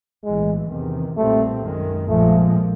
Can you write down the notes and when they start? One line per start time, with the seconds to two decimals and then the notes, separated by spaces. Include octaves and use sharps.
0.24 B1 A2 E3 G#3
0.70 E2 C3 D#3
1.16 B1 A#2 G3 A3 C4
1.63 F#2 D#3 G#3
2.08 A#1 A#2 F3 G#3 A3